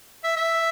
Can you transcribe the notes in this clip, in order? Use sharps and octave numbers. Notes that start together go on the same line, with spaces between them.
E5
E5